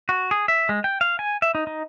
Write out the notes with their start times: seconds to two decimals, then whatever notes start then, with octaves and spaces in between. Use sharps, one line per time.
0.09 F#4
0.31 G#4
0.48 E5
0.69 G#3
0.84 G5
1.01 F5
1.19 G#5
1.42 E5
1.55 D#4
1.67 D#4